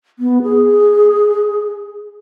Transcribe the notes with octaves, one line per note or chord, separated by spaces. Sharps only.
B3
G#4